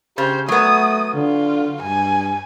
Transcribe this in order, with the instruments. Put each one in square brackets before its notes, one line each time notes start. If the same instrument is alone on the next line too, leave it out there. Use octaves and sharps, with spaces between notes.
[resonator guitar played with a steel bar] C#3 [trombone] G4 [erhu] C5
[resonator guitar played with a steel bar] F#3 B3 [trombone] A3 [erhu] D#6
[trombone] D3 [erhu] F4
[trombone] G2 [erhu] G#5